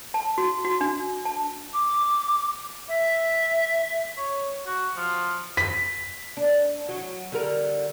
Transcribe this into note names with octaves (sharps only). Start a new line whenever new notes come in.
A5
F#4
F#4
D4
A5
D6
E5
C#5
F#4
F3
B6
D4
F#3
D3 G3 A#4